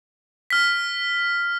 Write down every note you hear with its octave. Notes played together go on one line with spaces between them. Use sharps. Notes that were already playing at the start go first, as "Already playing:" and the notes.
F6 B6